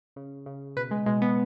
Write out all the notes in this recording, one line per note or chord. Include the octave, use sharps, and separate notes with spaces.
C#3
C#3
B2 B4
G#3
B2 G#3
B3